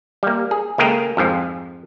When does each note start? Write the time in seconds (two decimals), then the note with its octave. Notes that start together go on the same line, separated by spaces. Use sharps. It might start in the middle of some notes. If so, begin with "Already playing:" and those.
0.23 G3 A#3
0.51 G#4
0.78 C#2 A3 A#3 G#4 A#4 G5
1.17 F2 G#2 F3